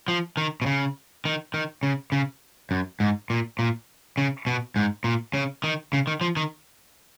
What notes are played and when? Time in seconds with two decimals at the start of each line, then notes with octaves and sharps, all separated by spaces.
0.08 F3
0.37 D#3
0.62 B2
0.66 C#3
1.25 D#3
1.54 D#3
1.83 C#3
2.12 C#3
2.71 F#2
3.00 G#2
3.30 A#2
3.59 A#2
4.18 C#3
4.47 B2
4.76 G#2
5.04 A#2
5.34 C#3
5.64 D#3
5.93 C#3
6.07 D#3
6.21 F3
6.37 D#3